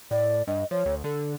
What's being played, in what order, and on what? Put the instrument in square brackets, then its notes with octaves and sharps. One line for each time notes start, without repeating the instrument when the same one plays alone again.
[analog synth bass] A2 [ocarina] D5
[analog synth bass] G2 [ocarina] D#5
[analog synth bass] F3 [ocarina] C#5
[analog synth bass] D2
[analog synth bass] D3 [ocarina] A4